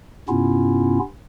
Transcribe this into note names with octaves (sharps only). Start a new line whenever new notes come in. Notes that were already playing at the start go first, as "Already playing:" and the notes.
G2 C3 B3 C#4 E4 F4